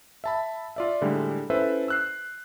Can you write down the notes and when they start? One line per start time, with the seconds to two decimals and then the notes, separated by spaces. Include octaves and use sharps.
0.24 E5 A5 B5
0.76 F4 D5 E5
1.01 A2 D3 G3 G#3
1.50 C#4 E4 A4 B4 C5 E5
1.88 E6 F#6 C7